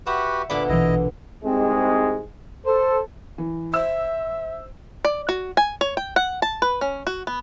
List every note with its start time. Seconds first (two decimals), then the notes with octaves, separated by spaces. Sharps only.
0.06 F#4 G4 B4 E5 F#5
0.50 A#2 D3 B3 D5 B5 D6
0.69 A#1 B2 E3 E4 D#5
1.44 C2 G#2 G#3 C4
2.66 A4 C5
3.38 E3
3.73 C5 E5 E6
5.05 D5
5.29 F#4
5.57 G#5
5.81 C#5
5.97 G5
6.16 F#5
6.42 A5
6.62 B4
6.81 C#4
7.07 F#4
7.27 B3